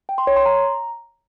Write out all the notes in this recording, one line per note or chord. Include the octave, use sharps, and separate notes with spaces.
G5
C6
C#5
C6
A#5